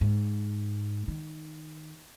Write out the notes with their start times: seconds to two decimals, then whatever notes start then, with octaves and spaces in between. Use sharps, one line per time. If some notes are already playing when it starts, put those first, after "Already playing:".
0.01 G#2
1.08 D#3